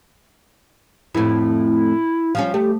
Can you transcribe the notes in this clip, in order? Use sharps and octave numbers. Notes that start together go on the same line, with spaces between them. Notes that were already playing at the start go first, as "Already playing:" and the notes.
F2 A2 E4
F3 G3 C#4 F5
A3 G4